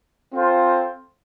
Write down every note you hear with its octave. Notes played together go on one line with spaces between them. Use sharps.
C4 F4 A4 C5